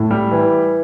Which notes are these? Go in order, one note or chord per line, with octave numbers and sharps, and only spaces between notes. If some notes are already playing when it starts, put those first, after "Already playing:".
Already playing: A2
G3
E3